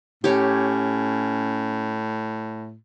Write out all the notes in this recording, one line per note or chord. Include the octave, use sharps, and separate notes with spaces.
A2 C#4 G4 C#5